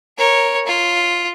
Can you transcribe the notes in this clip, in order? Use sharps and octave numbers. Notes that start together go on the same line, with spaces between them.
A#4 C#5
F4